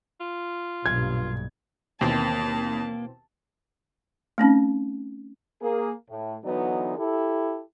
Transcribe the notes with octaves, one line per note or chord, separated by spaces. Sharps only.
F4
B1 G2 A#2 G#6
D#2 B2 E3 A#3 C4 A5
A3 C4 C#4 D#4
A#3 G#4
A2
D3 E3 F#3 B3 D#4
E4 G4 A4